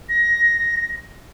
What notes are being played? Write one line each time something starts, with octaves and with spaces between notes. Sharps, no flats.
A#6